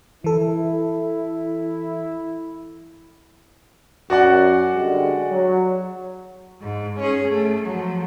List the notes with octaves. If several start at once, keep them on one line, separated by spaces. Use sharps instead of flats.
E3 E4 A4
F#2 F#4 D5 F#5
D3 G3 G#3
F#3
G#2
C#4 G#4
A3
F3 F#3